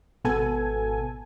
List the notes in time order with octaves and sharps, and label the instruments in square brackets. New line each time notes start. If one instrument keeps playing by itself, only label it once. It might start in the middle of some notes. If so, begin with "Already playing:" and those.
[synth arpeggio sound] G#1 B2 B3 A4 G#5